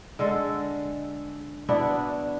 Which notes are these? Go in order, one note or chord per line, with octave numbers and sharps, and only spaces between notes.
D3 G#3 A4
B3 D4 E4 F#4